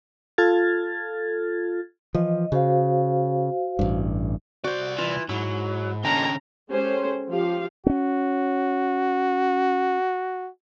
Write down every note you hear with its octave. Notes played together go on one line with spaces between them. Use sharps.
F4 A4 F6 G#6 A6
E3 F3 D#5
C#3 F#4 C5 F5
A1 G2
C2 F#4 C5 D5
E3 F4
G#2 F#3 E4
A#2 D3 G#3 C#4 G5 A5 A#5
G#3 C#4 G4 A4 C5
F3 F4 G4 F5
C4 C#4 F#4